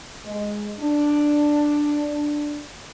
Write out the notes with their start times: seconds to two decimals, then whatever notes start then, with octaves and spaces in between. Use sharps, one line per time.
0.25 G#3
0.78 D4